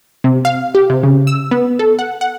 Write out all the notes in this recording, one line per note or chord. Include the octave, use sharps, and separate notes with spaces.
C3
F5
G4
C3
C#3
E6
B3
A4
F#5
F#5